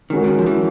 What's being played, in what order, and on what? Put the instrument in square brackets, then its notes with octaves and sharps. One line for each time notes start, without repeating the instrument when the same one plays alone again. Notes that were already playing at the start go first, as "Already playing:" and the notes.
[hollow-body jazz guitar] D#3 [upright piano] G#3 C#4 F#4 A#4
[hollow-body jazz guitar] F3
E3